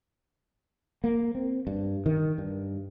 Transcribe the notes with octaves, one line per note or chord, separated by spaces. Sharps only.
A#3
C4
G2
D#3
G2